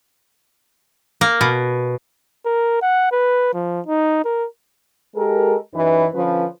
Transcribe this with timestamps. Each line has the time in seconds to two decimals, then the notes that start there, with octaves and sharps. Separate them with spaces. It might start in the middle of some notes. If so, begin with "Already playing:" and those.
1.21 A#3
1.41 B2
2.46 A#4
2.82 F#5
3.12 B4
3.54 F3
3.87 D#4
4.25 A#4
5.15 G#3 G4 A4 A#4
5.74 F#2 E3 D#4 B4
6.13 D3 F3 C#4 B4